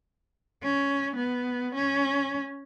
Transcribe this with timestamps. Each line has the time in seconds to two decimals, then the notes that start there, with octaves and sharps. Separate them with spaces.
0.63 C#4
1.16 B3
1.75 C#4